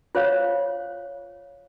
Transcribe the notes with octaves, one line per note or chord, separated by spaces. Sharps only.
F4 C5 C#5 F5